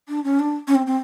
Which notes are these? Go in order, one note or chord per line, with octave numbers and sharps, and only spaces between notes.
D4
C#4
D4
C#4
C4
C4